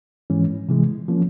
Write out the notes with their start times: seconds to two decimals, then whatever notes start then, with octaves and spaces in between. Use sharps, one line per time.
0.30 G#2 E3 G#3 C#4
0.69 C3 E3 G#3
1.08 F3 A#3 C#4